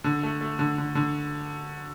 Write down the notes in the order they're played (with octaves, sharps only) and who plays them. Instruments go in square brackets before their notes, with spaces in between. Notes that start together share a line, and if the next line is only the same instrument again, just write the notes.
[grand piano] D3
A3
A3
D3
D3
D3